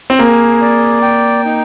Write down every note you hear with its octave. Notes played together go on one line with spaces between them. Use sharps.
C4
A#3 G#4
D5
G5
D#4